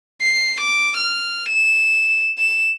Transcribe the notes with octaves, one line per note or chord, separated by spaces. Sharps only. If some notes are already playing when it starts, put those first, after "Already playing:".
C7
D6
F6
E7
E7